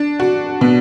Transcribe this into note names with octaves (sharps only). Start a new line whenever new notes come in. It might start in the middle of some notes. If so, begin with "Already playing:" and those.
Already playing: D4
F#4
B2